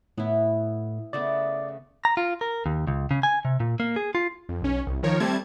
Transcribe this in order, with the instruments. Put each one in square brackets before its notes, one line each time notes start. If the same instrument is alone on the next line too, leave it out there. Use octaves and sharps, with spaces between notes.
[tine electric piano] A2 [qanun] B3 E4
[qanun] C#3 A3 B3 [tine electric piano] D5
[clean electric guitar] A#5
F4
A#4
D#2
C#2
C#3
G#5
C3
A#2
A#3
G#4
F4
[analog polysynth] F2
B1 C#4
C2
D#3 F3 A#4 C#5
G3 A3 C4 A5 G#6